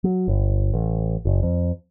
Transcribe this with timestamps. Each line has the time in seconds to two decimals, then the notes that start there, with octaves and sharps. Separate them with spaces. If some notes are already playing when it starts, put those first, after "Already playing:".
0.04 F#3
0.28 G1
0.74 A1
1.25 F#1
1.43 F2